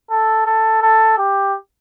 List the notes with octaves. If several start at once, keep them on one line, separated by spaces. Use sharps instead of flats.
A4
A4
A4
G4